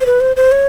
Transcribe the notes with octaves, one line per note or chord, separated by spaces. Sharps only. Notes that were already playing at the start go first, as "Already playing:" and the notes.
C5
B4
C5
C5
C#5